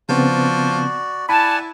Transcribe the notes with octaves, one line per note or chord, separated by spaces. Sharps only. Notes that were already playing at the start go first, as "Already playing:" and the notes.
C#3 F3 B3 C4 F#4 D5
E4 D5 F#5 G#5 A5 B5